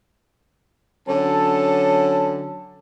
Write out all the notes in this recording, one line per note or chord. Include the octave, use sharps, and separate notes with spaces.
D3 F#3 C#4 A4 A5